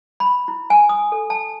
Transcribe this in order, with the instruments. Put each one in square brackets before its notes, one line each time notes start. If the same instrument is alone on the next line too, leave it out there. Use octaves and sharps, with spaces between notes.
[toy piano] B5
E4
G#5
D#6
A4
A5